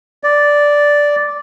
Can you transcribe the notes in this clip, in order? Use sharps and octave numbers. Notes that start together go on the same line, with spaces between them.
D5